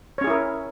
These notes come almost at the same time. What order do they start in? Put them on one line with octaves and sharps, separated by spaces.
C#5 C#4 G#4 E4 A#4